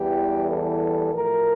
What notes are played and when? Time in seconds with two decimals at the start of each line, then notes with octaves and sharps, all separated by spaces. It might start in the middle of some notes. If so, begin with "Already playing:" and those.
Already playing: E2 E3 G3 G4
0.47 A4
1.13 A2 F3 A3 A#4